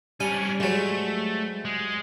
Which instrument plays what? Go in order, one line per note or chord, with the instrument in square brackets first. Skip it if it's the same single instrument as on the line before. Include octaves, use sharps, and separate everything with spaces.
[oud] G3 [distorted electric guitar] C#4 D4 [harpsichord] G#5
[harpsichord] G#2 F#3 [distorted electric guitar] A3
[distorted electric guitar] G#3